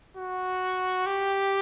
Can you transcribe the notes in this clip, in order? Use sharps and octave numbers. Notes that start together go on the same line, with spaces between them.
F#4
G4